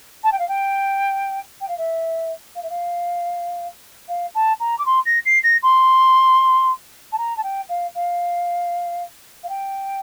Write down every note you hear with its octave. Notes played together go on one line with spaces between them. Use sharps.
A5
G5
F5
G5
G5
F5
E5
F5
E5
F5
F5
A5
A#5
D6
C6
A#6
C7
A#6
C6
A5
A#5
A5
G5
F5
F5
F5
G5